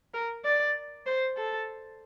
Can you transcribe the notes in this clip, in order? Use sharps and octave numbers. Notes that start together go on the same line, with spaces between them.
A#4
D5
C5
A4